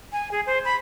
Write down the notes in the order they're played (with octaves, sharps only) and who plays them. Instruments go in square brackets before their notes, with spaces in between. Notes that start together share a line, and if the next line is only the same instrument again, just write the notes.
[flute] G#5
G#4
C5
B5